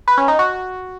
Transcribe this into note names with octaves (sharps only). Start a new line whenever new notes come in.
B4
C#4
D#4
F#4